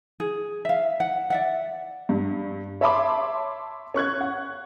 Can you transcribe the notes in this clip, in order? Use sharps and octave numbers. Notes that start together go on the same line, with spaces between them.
G#4
E5 F5
F#5
D5 E5 F#5
G2
C#5 E5 A5 B5 C6 D6
C#4 C#6 F#6 G#6
F#5